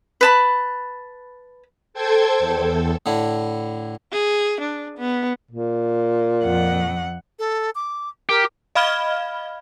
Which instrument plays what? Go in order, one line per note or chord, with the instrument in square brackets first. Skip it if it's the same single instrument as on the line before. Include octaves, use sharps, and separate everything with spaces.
[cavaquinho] B4 A5 B5
[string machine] A4 C5 G5 A5 G#6
E2 A4
[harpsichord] A2 D3 E4
[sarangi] G#4
D4
B3
[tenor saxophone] A#2
[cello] F2 F#5
[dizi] A4
D6
[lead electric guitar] G4 [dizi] A#4
[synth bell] D#5 F5 B5 F6 G#6 G7